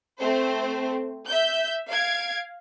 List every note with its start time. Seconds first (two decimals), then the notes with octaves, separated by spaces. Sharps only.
0.18 A3 C4 C5
1.26 E5 G6
1.89 F5 G#6 D7